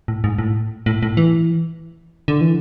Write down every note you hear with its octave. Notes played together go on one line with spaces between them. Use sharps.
A2
G#2
A2
A2
A2
E3
D3
E3